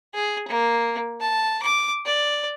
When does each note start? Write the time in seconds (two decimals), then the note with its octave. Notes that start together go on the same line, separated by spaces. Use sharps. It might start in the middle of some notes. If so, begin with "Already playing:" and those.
0.14 G#4
0.48 A#3
1.21 A5
1.62 D6
2.06 D5